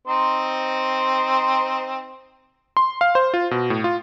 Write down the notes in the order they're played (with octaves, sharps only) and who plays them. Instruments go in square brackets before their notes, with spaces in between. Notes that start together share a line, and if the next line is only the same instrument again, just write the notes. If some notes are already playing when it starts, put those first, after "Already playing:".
[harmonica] C4 D#4 C5
[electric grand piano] C6
F5
C5
F4
B2
A2
F4